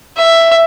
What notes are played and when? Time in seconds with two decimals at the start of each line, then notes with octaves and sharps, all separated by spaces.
0.17 E5